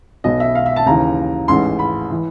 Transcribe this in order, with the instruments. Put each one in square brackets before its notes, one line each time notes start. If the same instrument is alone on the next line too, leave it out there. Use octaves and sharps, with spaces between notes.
[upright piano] B1 B2 D#5
E5
F5
E5
A5
D#2 C#3 E3 A#5
A1 G#2 E3 C6
B5
E3